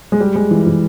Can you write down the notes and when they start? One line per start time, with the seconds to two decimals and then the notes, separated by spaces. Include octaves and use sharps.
0.12 G#3
0.20 G3
0.36 G#3
0.51 E3
0.67 E3